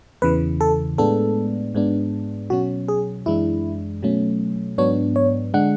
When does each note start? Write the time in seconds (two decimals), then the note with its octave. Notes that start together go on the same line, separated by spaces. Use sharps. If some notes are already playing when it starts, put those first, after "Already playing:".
0.22 E2 C#3 E3 B4
0.61 A4
0.98 A2 G#3 B3 D4 A4
1.74 G#2 G#3 B3 D4
2.50 B2 F#3 C#4 F#4
2.88 G#4
3.26 F#2 E3 G#3 D4 E4
4.03 B2 F#3 A3 C#4
4.78 G#2 F#3 B3 D4 C#5
5.16 C#5
5.54 D3 G#3 D4 F#5